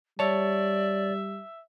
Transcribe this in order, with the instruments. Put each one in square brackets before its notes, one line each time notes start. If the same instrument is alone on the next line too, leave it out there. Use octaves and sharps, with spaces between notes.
[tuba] G3 [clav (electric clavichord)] C#5 A5 [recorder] D5 [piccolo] E5